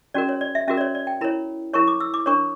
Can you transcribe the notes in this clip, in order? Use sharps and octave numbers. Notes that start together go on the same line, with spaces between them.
C#4 F#4 A#4 D5
C#5
D5
E5
C#4 F#4 A#4 E5
D5
C#5
D5
G5
E4 A#4 C#5 B5
E4 A#4 C#5 C#6
D6
E6
D6
D4 A#4 C#5 C#6